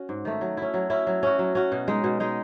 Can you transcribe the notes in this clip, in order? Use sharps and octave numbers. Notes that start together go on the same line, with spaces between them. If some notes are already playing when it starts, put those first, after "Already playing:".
Already playing: C#4 F#4
G#2
D#3 A3
F#3
C#4 E4
F#3
C#4 E4
F#3
C#4 F#4
F#3
C#4 F#4
B2
G#3 D#4
B2
G#3 D#4